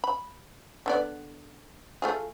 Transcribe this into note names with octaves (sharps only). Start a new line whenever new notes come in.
B5
D3 B3 D5
A3 F4 G#4